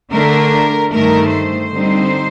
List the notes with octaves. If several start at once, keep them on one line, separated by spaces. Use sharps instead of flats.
D3 A3 D4 A#4
G2 D#3 A3 A#4
C5
D3 G3 C4 D#4